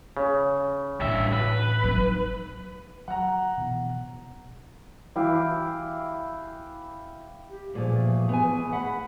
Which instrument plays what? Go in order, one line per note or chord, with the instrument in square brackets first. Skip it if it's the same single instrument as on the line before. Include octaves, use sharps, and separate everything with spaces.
[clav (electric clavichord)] C#3
[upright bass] A1 [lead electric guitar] G2 E5
[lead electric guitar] B4
[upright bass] F#3 D#4
[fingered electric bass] F#3 [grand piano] F#5 A#5
[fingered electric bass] B2 E3
[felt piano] E3 [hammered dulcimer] E4 G4 F5
[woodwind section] G4
[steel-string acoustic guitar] G2 A#2 F3 [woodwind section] E3 A3 G#4
[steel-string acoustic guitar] B3 G#5
[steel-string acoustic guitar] F#5 [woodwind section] B5